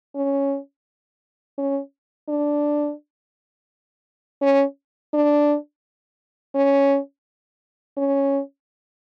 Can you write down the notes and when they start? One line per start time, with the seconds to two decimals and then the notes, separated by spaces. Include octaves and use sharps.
0.15 C#4
1.58 C#4
2.29 D4
4.42 C#4
5.14 D4
6.55 C#4
7.97 C#4